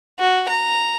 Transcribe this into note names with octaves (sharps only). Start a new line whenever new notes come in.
F#4
A#5